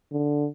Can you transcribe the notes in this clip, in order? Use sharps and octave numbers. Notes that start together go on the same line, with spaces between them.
D3